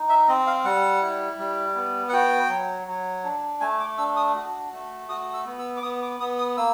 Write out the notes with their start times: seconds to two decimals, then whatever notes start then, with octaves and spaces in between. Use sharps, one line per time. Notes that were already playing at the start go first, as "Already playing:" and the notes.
Already playing: D#4
0.09 E5
0.28 C4 D#5
0.47 F5
0.64 G3 F#5
1.02 E4
1.39 G3
1.76 B3
2.09 F#5
2.13 F#4 G5
2.49 F#3
2.87 F#3
3.24 D4
3.61 A3 G#5
3.80 D6
3.98 D4 E6
4.16 D#6
4.35 F#4
4.73 A3
5.09 F#4 D#6
5.34 E6
5.46 B3
5.59 E6
5.77 D6
5.83 B3 D#6
6.02 D6
6.20 B3 D#6
6.39 D#6
6.57 A#3 E6